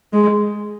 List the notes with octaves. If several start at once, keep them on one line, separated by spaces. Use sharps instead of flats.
G#3